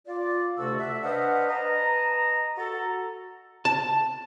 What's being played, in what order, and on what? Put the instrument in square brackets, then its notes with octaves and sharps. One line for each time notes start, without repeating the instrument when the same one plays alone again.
[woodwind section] F4 D5
D2 C3 A3 F#4 A5 E6
E5
D4 B4 C5 D#5 F5 F#5
B4 D#5 A5 A#5
F#4 A4 A#5
[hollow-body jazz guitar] A5